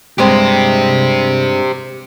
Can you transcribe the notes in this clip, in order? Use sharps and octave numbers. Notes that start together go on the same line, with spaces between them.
G2 G#3 C4 G4 C5